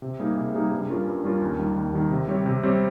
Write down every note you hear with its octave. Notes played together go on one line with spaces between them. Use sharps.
C3
G3 A#3 D#4 G#4
C3
G3 A#3 D#4 G#4
G2
G3 C#4 F4 A#4
G2
G3 C#4 F4 A#4
D#2
D#3 G3
D#2
D#3 G3
C3
G3 C4 G4 C#5
C3
G3 C4 G4 C#5